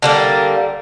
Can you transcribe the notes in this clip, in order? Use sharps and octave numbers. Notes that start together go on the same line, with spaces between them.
D3 G3 A#3